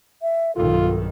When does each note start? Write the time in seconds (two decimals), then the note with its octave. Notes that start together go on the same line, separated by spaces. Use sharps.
0.22 E5
0.56 B1 G2 D#3 F4 A4